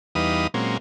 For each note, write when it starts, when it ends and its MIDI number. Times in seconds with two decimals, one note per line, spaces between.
0.15 0.47 40
0.15 0.47 55
0.15 0.47 63
0.15 0.47 71
0.15 0.47 77
0.15 0.47 87
0.54 0.77 46
0.54 0.77 54
0.54 0.77 56
0.54 0.77 58
0.54 0.77 60
0.54 0.77 61